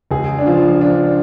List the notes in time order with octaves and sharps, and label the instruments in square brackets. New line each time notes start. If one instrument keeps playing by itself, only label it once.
[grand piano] C#2 G#4
D4
F3 F4
F3 D4